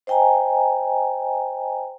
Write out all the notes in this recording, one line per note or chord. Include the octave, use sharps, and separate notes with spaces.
C5 D#5 G5 G#5 A#5